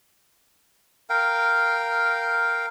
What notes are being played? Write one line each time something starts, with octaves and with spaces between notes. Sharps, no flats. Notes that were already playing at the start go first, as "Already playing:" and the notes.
A#4 F5 G5